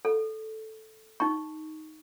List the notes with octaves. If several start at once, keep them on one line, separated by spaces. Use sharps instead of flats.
A4
D#4 C#6